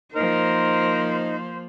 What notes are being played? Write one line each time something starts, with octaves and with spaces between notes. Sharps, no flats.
F3 A#3 D#4 A#4 C5